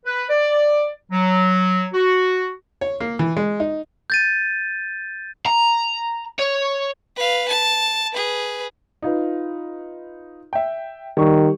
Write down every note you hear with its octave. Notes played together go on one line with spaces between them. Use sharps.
B4
D5
F#3
F#4
C#5
A#3
E3
G#3
D#4
G6 A6 D#7
A#5
C#5
B4 F5
A5
G#4 B4
D#4 F4 B4
E5 G5
D#3 G3 C#6